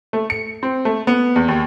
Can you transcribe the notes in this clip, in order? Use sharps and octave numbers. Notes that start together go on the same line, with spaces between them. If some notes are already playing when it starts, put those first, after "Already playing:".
A3
C#7
C4
A3
B3
E2
D#2